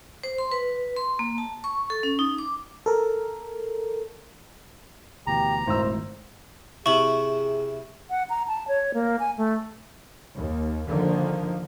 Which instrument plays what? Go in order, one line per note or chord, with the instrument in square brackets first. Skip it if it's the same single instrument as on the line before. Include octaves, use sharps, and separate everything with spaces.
[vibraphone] C5
C6
B4
C6
A#3
A5
C#6
A4
C#4
D#4
D6
[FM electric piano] A4 A#4
[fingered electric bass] D2 B2 E3 [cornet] G4 [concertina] A#5
[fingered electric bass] D#1 C#2 D#3 [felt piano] G#1 A2 E6 [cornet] C5
[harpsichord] C3 E4 [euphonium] G#4 [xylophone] C#6 F#7
[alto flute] F#5
A#5
A5
C#5
A#3
G#5
A3
[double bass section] D#2
D3 D#3 F3 A#3